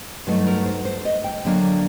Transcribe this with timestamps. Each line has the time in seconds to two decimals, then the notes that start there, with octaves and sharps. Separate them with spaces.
0.27 G2 F#3 A3 D#4 C5
0.47 A#4
0.66 C5
0.85 C5
1.05 D#5
1.24 G5
1.45 D3 F#3 A#3 D4